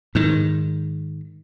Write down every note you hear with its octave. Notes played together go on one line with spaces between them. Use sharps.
G#2 D#3